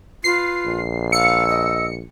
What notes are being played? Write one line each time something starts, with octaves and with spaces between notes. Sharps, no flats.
F4 B4 C7
A#1
F5 E6 C#7
D#5